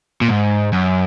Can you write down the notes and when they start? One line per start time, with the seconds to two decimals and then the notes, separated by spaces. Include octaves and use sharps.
0.21 A#2
0.29 G#2
0.73 F#2